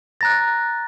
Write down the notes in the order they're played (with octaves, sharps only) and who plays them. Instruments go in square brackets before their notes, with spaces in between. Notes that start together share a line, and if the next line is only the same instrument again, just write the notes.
[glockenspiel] A#5 A6 [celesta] F#6 A#6